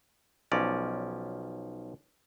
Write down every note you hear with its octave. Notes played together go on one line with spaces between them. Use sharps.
B1 F3 C#4 D5 A#5